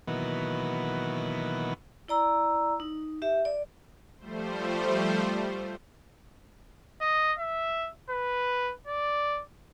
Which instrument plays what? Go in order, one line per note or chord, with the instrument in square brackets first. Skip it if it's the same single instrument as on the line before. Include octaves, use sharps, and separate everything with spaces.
[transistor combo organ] B2 D#3 E3 F#3 A#3 B3
[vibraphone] E4 D5 A#5 E6
D#4
G4 E5
D5
[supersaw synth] F3 G3 A3 C5
[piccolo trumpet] D#5
E5
B4
D5